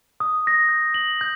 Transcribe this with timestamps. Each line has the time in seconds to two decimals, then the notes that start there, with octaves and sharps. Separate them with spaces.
0.20 D#6
0.47 A#6
0.69 G6
0.94 F#7
1.21 G6